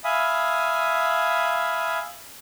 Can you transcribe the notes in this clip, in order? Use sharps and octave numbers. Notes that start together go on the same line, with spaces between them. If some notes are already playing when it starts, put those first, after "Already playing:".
E5 F5 G#5 B5 D#6